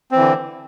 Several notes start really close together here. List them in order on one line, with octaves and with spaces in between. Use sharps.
C4 E3 D3